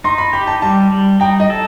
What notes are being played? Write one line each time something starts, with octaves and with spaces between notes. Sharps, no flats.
D#4 C6
B5
G4 B5
A5
G3 A5
G3
D#4 G5
D#5
A4